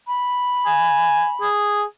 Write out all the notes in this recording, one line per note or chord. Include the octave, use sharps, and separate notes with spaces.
B5
G#5
G#4